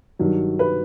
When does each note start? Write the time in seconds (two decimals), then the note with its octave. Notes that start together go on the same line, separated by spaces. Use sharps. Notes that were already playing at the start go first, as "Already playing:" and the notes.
0.19 G2 D#3 F#3
0.59 B4